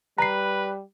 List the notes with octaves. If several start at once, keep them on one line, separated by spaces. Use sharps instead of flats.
G3 B4 A#5 C7